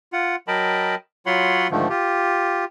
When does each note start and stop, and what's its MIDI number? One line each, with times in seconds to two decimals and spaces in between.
0.13 0.36 65
0.13 0.36 78
0.48 0.95 54
0.48 0.95 70
0.48 0.95 75
0.48 0.95 79
0.48 0.95 81
0.48 0.95 83
1.26 1.68 54
1.26 1.68 65
1.26 1.68 73
1.26 1.68 78
1.26 1.68 83
1.26 1.68 84
1.71 1.88 44
1.71 1.88 50
1.71 1.88 51
1.71 1.88 53
1.71 1.88 57
1.89 2.65 65
1.89 2.65 67